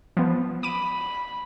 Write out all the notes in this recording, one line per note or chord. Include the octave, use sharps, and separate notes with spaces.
F3 B3
B5 D6 D#7